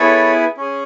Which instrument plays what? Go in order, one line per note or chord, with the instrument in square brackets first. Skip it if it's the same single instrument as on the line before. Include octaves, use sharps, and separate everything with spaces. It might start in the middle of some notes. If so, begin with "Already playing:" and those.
Already playing: [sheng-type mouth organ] B3 E4 G#4 A4 C#5
C#4 G#4